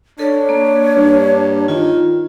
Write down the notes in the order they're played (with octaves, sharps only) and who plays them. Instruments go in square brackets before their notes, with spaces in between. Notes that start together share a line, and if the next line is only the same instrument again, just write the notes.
[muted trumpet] D4 [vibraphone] A4 [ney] C#5
[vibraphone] A#3
[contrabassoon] G2
[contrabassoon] D#3 [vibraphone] F4